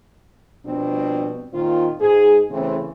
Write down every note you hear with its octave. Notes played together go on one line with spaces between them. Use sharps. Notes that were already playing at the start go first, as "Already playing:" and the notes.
B2 F3 G3 C4 D4
A#2 D#3 C4 F4
G#2 G#4
C#3 E3 A3 C4